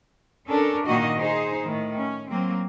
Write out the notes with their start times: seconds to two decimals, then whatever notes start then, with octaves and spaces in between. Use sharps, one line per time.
0.47 C#4 D4 A4 A#4
0.86 A#2 D#3 A#3 D#4 F#4 D#5
1.16 D#4 G#4 C5
1.64 A2 D#3
1.97 C#4
2.29 F#3 A#3 C4